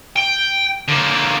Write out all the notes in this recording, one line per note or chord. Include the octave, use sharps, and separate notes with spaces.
G5
D3 A#3